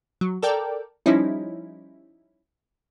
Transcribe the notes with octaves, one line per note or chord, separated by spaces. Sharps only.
F#3
A4 A#4 D5 G5
F3 G3 C#4 D#4 E4